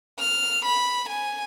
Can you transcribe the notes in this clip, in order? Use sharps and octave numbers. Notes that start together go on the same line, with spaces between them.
F6
B5
G#5